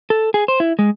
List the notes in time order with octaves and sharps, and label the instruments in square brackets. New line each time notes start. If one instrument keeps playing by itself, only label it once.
[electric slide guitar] A4
G#4
C5
E4
G#3